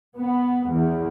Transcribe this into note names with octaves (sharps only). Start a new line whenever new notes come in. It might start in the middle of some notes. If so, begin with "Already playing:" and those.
B3
E2